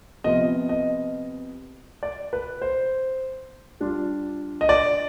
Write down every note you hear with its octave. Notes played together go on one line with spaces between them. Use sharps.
C3 F3 B3 F4 D#5
D#5
D5
B4
C5
G3 D4 F4
D#5
D5